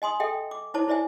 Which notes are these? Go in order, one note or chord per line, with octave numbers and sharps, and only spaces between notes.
D#5 G#5 C6 D#6
A4 D#5 E5 G5
D6
D#4 E4 C5 C#5 A5 D6
E4 C5 D5 E5 G#5